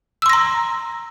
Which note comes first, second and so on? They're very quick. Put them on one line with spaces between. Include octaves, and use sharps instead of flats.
E6 C6 A#6 A#5